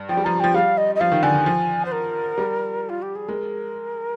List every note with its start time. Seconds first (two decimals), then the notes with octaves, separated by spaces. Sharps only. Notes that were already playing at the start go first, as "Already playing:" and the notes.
Already playing: G2
0.09 F3 G5
0.17 G3
0.25 F3 A#5
0.40 F3 G5
0.54 G3 F5
0.78 D#5
0.95 D#5
1.00 F3 F5
1.12 D#3
1.23 D3 G#5
1.34 D#3
1.46 F3
1.85 C5
1.92 A#4
2.38 G3
2.89 F4
3.02 G4
3.16 G#4
3.29 G#3 A#4